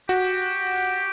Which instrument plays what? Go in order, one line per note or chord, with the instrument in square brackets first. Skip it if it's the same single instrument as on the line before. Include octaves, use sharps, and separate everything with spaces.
[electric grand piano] F#4 [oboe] G4